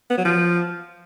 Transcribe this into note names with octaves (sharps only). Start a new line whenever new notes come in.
B3
F#3
F3